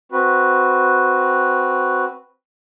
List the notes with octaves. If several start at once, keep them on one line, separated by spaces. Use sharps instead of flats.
C4 F#4 B4